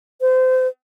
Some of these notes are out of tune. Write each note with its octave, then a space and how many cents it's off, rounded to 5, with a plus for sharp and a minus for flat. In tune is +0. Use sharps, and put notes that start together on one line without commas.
C5 -30